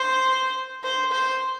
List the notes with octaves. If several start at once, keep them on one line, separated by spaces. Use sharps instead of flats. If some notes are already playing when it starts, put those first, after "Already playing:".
Already playing: C5
C5
C5